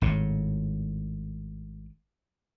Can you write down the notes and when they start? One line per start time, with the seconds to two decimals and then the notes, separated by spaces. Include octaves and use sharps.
0.01 G#1 A2